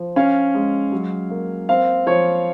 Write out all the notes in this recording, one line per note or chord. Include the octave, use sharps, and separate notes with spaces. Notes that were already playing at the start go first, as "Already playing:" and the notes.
Already playing: F3
C#4 F5
G#3
F#3
A#3
C4 F5
F3 C#5